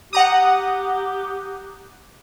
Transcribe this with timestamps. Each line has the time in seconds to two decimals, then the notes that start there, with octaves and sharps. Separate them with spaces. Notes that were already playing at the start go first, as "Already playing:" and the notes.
0.13 G4 F#5 A#5 D#6